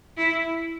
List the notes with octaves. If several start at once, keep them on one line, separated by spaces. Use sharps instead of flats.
E4